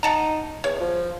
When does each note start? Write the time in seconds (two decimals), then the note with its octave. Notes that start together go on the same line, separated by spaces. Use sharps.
0.03 D#4 F#5 A5 A#5
0.64 E2 C#5
0.81 F3